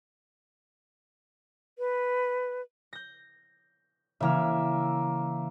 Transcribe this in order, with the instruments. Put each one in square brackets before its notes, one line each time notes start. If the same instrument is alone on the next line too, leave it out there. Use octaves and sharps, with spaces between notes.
[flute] B4
[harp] G6 A#6
[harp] C#3 E3 F6 [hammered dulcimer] A#3 E5